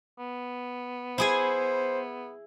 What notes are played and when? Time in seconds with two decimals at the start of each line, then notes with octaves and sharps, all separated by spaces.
0.19 B3
1.18 E4 G#4 C5 G#5